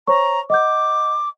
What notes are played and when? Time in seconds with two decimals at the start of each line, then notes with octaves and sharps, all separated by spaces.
0.07 C5 C#5 A#5 C#6
0.50 D#5 F#5 D6 G6